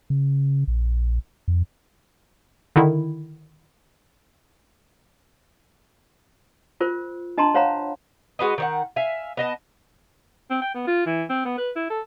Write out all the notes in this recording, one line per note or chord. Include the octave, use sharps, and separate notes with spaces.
C#3
A#1
F2
D3 D#3 E4
F4 A#4 C5
D4 D#5 A5 A#5 C6
C5 C#5 F5 F#5 A#5 B5
G#3 F#4 B4 D#5
D#3 C#5 F#5
E5 F5 G#5
B3 D#5 A5
C4
G5
B3
F4
E3
C4
B3
B4
E4
A4